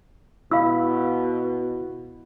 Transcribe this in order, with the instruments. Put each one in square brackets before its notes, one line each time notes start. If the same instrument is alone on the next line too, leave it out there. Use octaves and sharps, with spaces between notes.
[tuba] B2 [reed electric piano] E4 B5 [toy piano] F5 E6